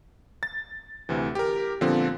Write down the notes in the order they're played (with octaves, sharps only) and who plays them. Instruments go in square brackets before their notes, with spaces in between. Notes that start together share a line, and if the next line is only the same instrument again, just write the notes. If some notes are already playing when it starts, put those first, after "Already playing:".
[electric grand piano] A6
D2 C3 E3
G4 A#4
A#2 D3 F3 B3 C4